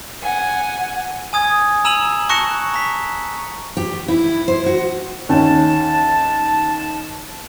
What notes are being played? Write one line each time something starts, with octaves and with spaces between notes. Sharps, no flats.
F#5 G#5
G#5 D#6 G#6
A#5 E6 D#7 E7 F#7
A5 C#6 F#6 A#6 C#7 E7
A#5 B6
G4
E4
C5
F#4
D#2 C#4 G5 A5